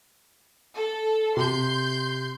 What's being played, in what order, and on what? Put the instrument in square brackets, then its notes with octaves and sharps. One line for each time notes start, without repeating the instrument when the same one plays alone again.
[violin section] A4
[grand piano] C3 [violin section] C6 G6